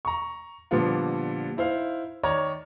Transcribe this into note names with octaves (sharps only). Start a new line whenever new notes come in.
A#5 C#6
A#2 D3 F3 G3 B3 F4
D#4 E4 C5 F5
D#3 C#5 D5 A#5